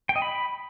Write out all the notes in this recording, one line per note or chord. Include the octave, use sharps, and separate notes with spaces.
G5
D#5
B5